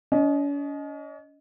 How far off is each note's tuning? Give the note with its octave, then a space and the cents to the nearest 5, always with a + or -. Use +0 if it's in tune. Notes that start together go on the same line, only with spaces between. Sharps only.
C#4 +45 D#5 +0